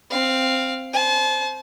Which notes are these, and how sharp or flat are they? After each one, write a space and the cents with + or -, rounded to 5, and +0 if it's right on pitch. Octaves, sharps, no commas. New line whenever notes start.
C4 +0 F5 +0
C5 +0 A5 -40